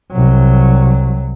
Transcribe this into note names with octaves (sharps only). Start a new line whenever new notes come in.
C2 F#3